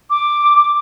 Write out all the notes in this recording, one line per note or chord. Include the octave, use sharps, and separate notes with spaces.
D6